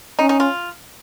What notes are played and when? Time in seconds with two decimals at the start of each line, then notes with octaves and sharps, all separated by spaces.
0.19 C#4 D#4
0.29 D#4
0.40 F4